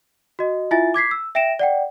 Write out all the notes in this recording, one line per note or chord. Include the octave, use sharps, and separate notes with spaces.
F#4 D#5
E4 F4 E5 G#5 A6
D6 G#6 B6 C7
E6
E5 G5 A#6 D7 E7
D5 F#5 G5